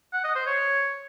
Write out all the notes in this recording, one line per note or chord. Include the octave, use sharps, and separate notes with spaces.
F#5
D#5
C5
C#5